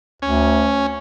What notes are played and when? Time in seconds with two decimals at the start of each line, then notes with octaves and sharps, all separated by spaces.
0.22 D2 C#4